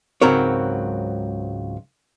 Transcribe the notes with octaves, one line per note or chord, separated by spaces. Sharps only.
C#2 G#2 F#3 C4 A#4 C#5